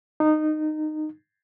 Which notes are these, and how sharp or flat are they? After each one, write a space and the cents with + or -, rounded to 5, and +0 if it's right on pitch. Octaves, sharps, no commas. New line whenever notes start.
D#4 -20